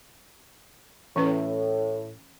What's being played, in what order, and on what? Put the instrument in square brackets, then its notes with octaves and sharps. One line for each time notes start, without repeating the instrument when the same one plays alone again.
[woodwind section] A2 [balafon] E3 C#4 B4